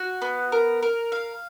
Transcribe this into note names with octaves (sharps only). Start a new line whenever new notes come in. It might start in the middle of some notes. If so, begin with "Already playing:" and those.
Already playing: F#4
B3
A#4
A#4
F5